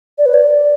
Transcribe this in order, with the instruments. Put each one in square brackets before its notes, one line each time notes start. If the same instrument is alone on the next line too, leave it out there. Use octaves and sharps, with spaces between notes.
[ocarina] D5
B4
D5